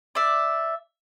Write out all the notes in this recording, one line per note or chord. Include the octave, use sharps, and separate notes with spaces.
D5 E5